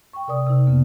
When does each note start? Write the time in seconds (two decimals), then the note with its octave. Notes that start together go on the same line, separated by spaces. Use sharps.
0.13 G5 C#6
0.28 C3 A#4 D5 D#6
0.47 C3 D#4
0.67 F2 C#3 A#3 B3